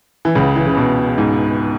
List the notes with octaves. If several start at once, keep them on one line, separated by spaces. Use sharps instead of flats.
E3
C#2 C#3
E3
C#3
B2
G#2